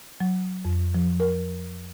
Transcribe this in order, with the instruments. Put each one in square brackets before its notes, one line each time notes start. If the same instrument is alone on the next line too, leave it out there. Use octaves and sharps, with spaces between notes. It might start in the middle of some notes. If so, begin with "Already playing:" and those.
[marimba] F#3
F2
F3
A#4